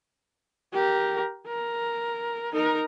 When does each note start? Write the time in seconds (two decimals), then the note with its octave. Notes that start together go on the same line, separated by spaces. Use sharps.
0.73 G4 A#4
1.47 A#4
2.53 D#4 A#4